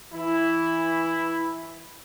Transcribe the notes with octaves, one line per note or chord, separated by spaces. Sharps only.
E3 E4